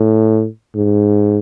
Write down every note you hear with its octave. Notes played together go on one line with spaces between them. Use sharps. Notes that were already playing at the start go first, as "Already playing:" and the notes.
Already playing: A2
G#2